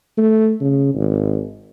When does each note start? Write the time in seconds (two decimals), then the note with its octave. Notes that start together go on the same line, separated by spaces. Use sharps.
0.18 A3
0.61 C#3
0.94 G#1